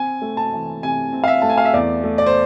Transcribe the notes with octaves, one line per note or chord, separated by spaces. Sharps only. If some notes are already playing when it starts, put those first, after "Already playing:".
Already playing: C4 G#5
A3
A5
E3
C3 G#5
C4
F5
E5
A3 A5
G#5
F5
E5
E2 D5
A3
D5
C5